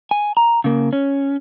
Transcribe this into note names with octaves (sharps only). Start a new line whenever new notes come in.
G#5
A#5
C#3 A#3
C#4